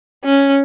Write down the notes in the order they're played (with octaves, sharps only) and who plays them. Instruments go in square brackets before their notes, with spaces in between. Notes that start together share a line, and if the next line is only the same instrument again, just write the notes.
[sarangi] C#4